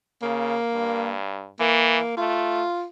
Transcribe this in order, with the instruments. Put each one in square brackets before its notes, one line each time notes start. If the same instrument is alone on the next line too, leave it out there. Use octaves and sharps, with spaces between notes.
[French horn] C#3 [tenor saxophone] A#3
[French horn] G2
[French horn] E3 [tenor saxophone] A#3
[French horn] A3 [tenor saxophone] F4